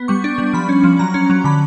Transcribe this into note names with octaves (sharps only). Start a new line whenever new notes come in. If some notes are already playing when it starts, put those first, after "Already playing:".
Already playing: B3
G3 C#6
D4
G3
F3 B5
C#4
F3
F#3 A#5
C#4
F#3
D3 B5